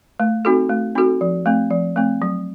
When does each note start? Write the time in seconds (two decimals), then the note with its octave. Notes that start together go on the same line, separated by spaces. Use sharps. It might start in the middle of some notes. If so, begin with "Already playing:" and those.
0.20 A3
0.45 C4 D#4 F#4 A4
0.70 A3
0.95 C4 D#4 F#4 A4
1.21 F3
1.46 A3 C4
1.70 F3
1.96 A3 C4
2.22 F#3